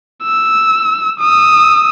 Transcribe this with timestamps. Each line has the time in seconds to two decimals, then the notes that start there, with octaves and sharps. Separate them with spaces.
0.23 E6
1.20 D#6 E6